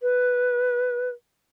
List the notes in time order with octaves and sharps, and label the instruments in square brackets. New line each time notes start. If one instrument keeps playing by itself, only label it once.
[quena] B4